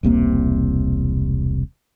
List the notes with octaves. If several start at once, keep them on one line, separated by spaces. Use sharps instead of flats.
E1 C2 C3 A#3